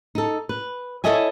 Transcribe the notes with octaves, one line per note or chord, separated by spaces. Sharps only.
D#4 A4
B4
E4 A4 C#5 D#5 E5 G#5